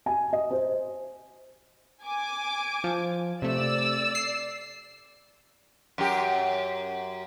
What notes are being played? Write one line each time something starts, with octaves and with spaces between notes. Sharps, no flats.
G#5
D#5
C5
G#5 D6
F3
C3 A3 D5 E6
C7
F#2 G4